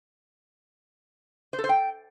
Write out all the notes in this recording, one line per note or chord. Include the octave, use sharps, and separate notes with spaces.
C5
A4
C5
G5